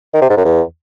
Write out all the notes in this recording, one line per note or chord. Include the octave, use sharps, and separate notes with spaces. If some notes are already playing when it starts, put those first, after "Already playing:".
D#3
C3
G#2
F#2
E2